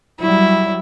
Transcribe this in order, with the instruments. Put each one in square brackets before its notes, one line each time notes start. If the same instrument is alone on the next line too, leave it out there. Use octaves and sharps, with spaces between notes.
[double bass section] F#3 G3 [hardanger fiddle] E4